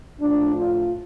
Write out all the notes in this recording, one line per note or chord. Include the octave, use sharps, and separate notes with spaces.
A2 F3 D4
F4